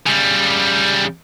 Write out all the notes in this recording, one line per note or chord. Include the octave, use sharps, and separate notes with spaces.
C#3 G3